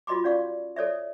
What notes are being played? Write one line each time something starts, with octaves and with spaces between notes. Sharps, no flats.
F4 F#4 D#5 B5 C6 D6
C#4 D5 F5 C#6
A4 C#5 D5 E5